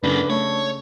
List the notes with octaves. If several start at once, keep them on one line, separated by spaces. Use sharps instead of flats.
F#2 C#3 A#3 D4 A4 B4
A3 C#5